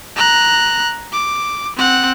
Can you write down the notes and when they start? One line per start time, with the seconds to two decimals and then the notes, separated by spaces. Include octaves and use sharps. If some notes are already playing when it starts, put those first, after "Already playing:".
0.16 A#5 F#6
1.12 D6
1.76 C4 F#5